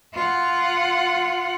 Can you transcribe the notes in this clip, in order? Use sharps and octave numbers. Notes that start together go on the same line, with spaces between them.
F4 F#5